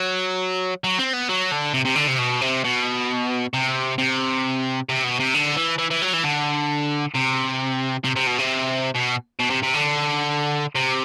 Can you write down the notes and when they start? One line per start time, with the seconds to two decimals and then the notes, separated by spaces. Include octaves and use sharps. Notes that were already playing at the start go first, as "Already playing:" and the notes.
Already playing: F#3
0.84 F#3
0.98 C4
1.13 B3
1.29 F#3
1.51 D3
1.74 C3
1.85 C3
1.96 D3
2.08 C3
2.19 B2
2.41 C3
2.64 B2
3.54 C3
3.98 C3
4.89 C3
5.04 B2
5.20 C3
5.35 D3
5.56 E3
5.78 E3
5.91 E3
6.02 F#3
6.13 E3
6.24 D3
7.14 C3
8.04 C3
8.16 C3
8.27 B2
8.38 C3
8.95 B2
9.39 B2
9.50 C3
9.63 C3
9.74 D3
10.75 C3